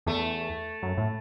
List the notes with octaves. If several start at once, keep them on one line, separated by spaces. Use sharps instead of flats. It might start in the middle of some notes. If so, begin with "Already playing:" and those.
E2 A3
F#2
A2